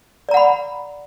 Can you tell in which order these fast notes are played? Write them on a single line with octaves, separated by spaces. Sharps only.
D5 A#5 F#5 B5